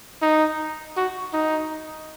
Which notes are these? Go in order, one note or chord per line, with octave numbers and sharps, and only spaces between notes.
D#4
F#4
D#4